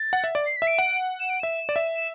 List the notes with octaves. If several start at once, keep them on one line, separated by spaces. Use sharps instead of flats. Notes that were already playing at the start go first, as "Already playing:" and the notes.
Already playing: A6
F#5
E5
D5
C7
B6
E5
D7
F#5
E7
D7
E5 E7
D5
E5
E7